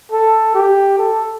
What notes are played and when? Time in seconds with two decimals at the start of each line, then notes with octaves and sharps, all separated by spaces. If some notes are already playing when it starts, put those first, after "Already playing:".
0.12 A4
0.55 G4
0.98 A4